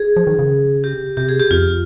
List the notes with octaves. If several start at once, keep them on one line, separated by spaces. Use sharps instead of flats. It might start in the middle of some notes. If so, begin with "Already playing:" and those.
Already playing: G#4
F3
D#3
C#3
G4
C3 G4
G#4
G4
F2 F4